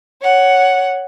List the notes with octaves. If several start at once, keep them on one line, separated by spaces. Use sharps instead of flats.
C#5 F#5